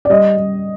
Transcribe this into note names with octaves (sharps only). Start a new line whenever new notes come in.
D5
G3 D#5
G3